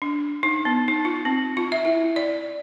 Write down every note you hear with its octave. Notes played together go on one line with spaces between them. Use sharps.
D4
D#4
B3
D#4
F4
C4
F4
E5
E4
D5